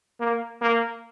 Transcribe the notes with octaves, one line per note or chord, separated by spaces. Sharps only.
A#3
A#3